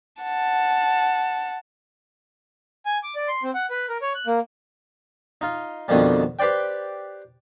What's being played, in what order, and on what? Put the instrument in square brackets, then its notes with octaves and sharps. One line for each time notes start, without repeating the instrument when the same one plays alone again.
[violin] F#5 A5
[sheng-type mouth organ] G#5
D6
D5
C6
C4
F#5
B4
A#4
C#5
F#6
A#3
[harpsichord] D#4 F4
F2 B2 D3 D#3 F3 G3
G4 B4 C5 D5 G5